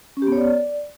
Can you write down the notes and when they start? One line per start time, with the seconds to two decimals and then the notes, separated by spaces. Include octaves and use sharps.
0.17 C#4
0.22 G4
0.27 B3
0.32 C#5
0.37 D5